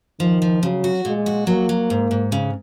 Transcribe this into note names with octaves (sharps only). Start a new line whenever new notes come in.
D#3 F3
F3
C#3 F#3
F#4
A#2 G#3
F#4
F#3 A#3
F#3
G#2
G#2
C#3